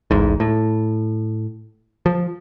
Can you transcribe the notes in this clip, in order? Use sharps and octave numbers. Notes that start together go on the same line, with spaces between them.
D1 A1 G#2
A2
F3